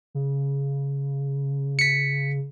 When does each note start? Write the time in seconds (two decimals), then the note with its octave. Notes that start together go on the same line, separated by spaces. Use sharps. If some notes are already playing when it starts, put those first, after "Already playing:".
0.15 C#3
1.79 B6 C#7